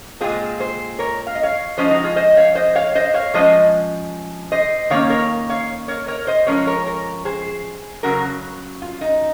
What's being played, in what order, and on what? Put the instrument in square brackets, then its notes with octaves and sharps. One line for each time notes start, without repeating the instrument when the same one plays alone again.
[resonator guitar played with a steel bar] A#2 G#3 C4 F4 G#4
G#4 C5
A#4 C#5
F5
D#5
C#5 F5
F3 G#3 C#4 C5 D#5
D#4 F#4
F4 G#4
C5 D#5
C#5 F5
C5 D#5
C#5 F5
C5 D#5
C#5 F5
F3 G#3 C#4 C5 D#5
C5 D#5
D#3 A#3 C#4 C#5 F5
A#4 C#5
C#5 F5
A#4 C#5
A#4 C#5
C5 D#5
F3 G#3 C#4 A#4 C#5
A#4 C#5
A#4 C#5
G#4 C5
C#3 F#3 C#4 F#4 A#4
F4
D#4